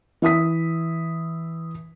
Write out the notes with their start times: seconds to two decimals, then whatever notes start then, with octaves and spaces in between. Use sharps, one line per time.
0.22 E3 E5 D#6 B6